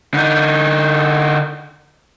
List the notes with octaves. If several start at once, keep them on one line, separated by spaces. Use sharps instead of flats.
D3 D#4